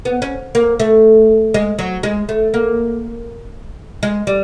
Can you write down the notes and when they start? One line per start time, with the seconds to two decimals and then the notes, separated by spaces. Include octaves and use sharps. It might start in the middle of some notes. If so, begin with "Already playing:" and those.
0.05 B3
0.22 C#4
0.55 A#3
0.80 A3
1.54 G#3
1.79 F#3
2.03 G#3
2.29 A3
2.54 A#3
4.03 G#3
4.27 G3